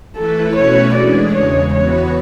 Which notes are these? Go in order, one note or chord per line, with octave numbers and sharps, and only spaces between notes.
E3 A3 E4 A4 B4
B2 A3 C#4 F#4 B4 C#5
E3 G#3 D4 G#4 D5
E2 C#3 G#3 C#5
E3 B3 F#4 B4 C#5